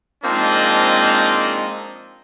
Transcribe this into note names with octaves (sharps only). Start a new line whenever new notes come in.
F3 G#3 A#3 C4 D4 D#4